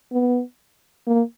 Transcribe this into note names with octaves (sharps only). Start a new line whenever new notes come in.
B3
A#3